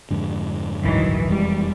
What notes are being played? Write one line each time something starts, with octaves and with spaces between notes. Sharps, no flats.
F2 G#2 D3
A1 D2 G2 D#3 E3 F#3
E1 F2 E3 G3 G#3